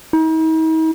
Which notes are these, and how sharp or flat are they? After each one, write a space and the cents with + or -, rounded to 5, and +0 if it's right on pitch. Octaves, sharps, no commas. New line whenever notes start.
D#4 +45